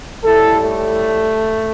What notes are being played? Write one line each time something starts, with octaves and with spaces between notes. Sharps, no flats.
A2 G3 E4 A4
A3